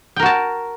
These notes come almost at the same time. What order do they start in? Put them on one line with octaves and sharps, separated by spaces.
G5 A#4 F#4 A5